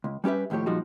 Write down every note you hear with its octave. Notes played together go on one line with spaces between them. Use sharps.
C#2
G3 C#4 G4 B4 E5
D#2 A2 F3 G4 C#5
A#2 F3 G3 G#3 D#4 F#4